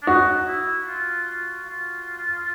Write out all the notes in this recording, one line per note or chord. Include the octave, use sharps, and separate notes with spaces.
D4
D#4 F#4
E4
F4
F4